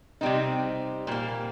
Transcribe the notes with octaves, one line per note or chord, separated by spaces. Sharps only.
C3 G3 C4 D#4
A#2 G3 A#3